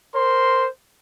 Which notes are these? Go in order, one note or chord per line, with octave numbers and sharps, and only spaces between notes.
A#4 C5 C6